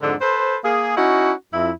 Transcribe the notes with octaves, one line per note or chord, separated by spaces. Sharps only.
F2 G#2 D3
A4 B4 C5
A#3 G#4
C#4 D#4 E4 F#4
F2 E4